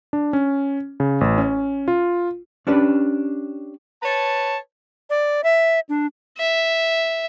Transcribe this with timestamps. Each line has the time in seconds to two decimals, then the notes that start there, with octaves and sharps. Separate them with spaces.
0.13 D4
0.33 C#4
1.00 C#3
1.21 A1
1.38 C#4
1.88 F4
2.67 C#4 D4 G4 B4
4.03 B4 C#5 A5
5.10 D5
5.44 E5
5.89 D4
6.38 E5